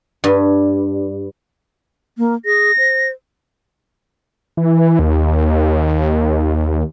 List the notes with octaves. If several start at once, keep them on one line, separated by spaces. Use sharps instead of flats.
G2
A#3
G#4 A#6
C5
E3
D#2